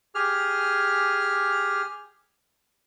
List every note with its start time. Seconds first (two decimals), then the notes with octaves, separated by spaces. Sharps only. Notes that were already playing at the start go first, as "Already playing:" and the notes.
0.15 G4 G#4 F6